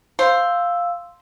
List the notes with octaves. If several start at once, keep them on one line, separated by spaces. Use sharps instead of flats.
C5 F5 E6